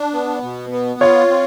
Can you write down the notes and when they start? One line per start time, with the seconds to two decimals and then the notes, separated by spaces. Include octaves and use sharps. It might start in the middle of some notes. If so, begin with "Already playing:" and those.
Already playing: D4
0.13 B3
0.43 B2
0.71 B3
1.00 F4 C#5
1.29 C4